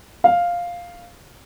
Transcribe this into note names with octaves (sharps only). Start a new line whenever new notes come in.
F5